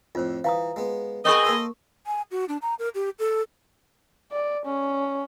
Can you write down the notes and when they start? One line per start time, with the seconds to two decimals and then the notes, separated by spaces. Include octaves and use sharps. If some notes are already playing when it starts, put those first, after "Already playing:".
0.15 F2 A2 F4 C5
0.44 E3 F5 A#5 D#6
0.76 G#3 B3
1.25 B3 C4 G#4 A#4 D#5 C#6 D#6
1.44 A#3 A4 C5
2.06 G#5
2.31 F#4
2.48 D4
2.62 A#5
2.79 A#4
2.95 G4
3.19 A4
4.32 D5
4.66 C#4